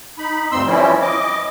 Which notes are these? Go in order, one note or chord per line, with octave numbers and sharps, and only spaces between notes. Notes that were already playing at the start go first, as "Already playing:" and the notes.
D#4 B5
D2 G2 C4 C6 E6
E3 F3 G3 C4 C#4 E4
D#5 D6